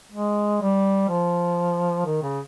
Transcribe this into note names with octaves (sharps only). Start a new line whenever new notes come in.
G#3
G3
F3
D#3
C#3